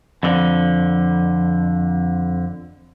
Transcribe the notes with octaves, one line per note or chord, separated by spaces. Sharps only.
F2 D3